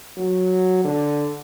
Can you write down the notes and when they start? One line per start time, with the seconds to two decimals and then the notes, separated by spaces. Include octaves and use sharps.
0.17 F#3
0.85 D3